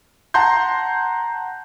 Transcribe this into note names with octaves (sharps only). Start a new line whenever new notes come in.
F#5 A5 A#5 C6 G6